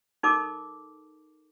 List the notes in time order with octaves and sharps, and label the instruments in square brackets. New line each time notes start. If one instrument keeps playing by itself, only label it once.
[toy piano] D#4 A4 A#4 D6